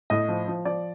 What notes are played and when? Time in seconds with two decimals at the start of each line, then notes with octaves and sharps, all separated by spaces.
0.10 A2 D#5
0.28 F3
0.48 F3
0.65 F3 D5